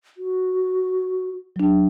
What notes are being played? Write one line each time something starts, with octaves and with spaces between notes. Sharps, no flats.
F#4
F#3 D4